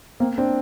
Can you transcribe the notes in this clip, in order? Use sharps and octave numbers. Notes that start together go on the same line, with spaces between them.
A#3 C4
C4 D4